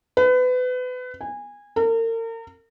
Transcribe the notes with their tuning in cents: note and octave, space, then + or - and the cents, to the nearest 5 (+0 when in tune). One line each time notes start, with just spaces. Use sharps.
B4 +30
G#5 -20
A#4 -40